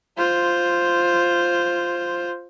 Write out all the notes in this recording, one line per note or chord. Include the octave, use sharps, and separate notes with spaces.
F4 C5